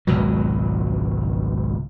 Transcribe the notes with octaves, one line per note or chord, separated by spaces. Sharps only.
G#1 C#2 B2 F#3